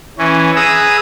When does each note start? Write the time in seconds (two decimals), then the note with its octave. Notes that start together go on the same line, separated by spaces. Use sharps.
0.18 E3 C#4
0.56 G#4 B4 A#5 D#6 E6